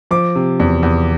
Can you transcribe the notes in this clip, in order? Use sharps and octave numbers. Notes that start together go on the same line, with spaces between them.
F3 D6
C3
E2
E2